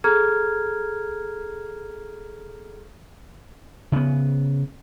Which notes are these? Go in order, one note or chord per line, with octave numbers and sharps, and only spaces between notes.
G#4 A4 A#5 F6 G#6
C#3 B3